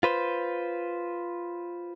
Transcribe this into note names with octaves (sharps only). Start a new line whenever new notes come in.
F4 B4 C5